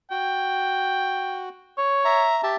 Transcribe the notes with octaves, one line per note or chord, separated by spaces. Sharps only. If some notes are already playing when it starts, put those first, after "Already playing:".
F#4 G5
C#5
E5 A#5
G4 E5 A5